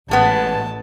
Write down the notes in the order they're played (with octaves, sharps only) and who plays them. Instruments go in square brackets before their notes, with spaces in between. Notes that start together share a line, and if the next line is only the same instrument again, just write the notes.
[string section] A1 [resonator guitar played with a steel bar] G#3 B3 [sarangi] A5